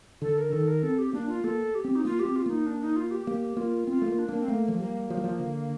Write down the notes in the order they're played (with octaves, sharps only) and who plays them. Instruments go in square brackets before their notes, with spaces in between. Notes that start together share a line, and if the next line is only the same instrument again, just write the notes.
[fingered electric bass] D3 [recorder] A4
[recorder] A#4
[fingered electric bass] D#3 [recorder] A4
[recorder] A#4
[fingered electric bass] C4 [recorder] A4
[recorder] G4
[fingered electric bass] A#3 [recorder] D4
[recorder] F4
[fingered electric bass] A#3 [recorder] A4
[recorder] G4
[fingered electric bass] C4
[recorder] D#4
[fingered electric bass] A#3 [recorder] F4
[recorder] G4
[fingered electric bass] C4
[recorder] F4
[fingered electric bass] A#3 [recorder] D#4
[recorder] D4
D#4
F4
G4
[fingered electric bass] A#3 [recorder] G4
[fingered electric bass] A#3 [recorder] F4
[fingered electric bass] C4 [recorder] F4
[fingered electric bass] A3
A#3
[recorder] D4
[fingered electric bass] A#3
[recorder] C4
[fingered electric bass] A3 [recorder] A#3
[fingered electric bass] F3
[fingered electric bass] G3 [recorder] A#3
[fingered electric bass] F3
G3
F3
D3